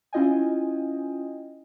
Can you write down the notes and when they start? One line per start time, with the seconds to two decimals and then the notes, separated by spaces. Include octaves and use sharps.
0.13 C#4 E4 F4 D#5 G5 G#5